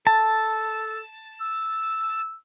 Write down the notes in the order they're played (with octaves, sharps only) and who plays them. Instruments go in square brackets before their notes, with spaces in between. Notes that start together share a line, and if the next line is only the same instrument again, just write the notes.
[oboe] A4 [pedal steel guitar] A5
[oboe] E6